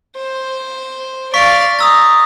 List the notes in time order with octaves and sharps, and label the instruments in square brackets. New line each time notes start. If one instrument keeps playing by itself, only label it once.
[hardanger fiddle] C5
[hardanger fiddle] D5 F5 [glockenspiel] C#6 B6
[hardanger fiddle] A#5 [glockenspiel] D#6 E6 A6